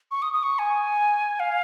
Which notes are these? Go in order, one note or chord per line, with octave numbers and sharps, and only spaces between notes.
C#6
D#6
D#6
C#6
G#5
F5